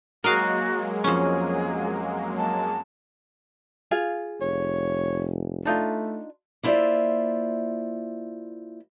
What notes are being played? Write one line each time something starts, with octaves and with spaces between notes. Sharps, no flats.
F#3 G#3 A#3 F#4 A#4 D#5 F5
F2 C#4 G#4
A5
F4 G#4 F5
F1 C#5
A3 D4 D#4 F4
A#3 E4 F4 C5 D5 E5